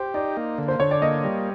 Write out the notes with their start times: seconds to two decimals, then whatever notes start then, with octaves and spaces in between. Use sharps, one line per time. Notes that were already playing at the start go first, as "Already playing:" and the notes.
Already playing: G4 C5
0.14 D#4 D5
0.37 A#3
0.58 D3
0.68 C5
0.80 D3 C#5
0.91 D5
1.02 A#3 D#5
1.24 G3